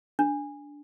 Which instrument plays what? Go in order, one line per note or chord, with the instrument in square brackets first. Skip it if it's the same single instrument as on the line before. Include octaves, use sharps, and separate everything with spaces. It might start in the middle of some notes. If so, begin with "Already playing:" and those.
[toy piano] D4